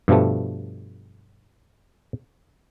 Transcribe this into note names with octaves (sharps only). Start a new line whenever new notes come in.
G2 B2 F3 G3 A3